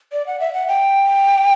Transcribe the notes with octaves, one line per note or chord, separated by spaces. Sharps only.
D5
F#5
E5
F#5
G5